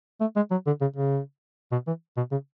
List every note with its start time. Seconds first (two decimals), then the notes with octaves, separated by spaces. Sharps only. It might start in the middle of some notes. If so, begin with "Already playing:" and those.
0.21 A3
0.36 G#3
0.51 F#3
0.66 D3
0.81 C#3
0.96 C#3
1.72 B2
1.87 E3
2.17 B2
2.31 C#3